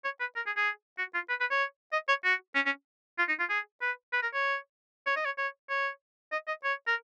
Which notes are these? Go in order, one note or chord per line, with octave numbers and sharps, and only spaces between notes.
C#5
B4
A#4
G#4
G#4
F#4
F4
B4
B4
C#5
D#5
C#5
F#4
C#4
C#4
F4
D#4
F4
G#4
B4
B4
A#4
C#5
C#5
D#5
C#5
C#5
C#5
D#5
D#5
C#5
A#4